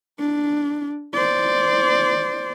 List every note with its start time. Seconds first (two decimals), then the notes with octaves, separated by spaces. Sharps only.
0.19 D4
1.14 C5 D5